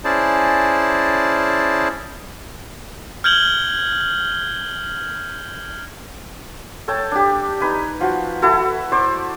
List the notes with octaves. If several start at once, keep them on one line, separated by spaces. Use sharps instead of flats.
C#4 E4 G#4 C5 D5 A5
F6 G6 G#6 F#7 G7
A4 C#5 G5 A5
D4 G4
D#4 B4 G#5
F3 F#4
E4 F#4 A4
C5 D5 C#6 D6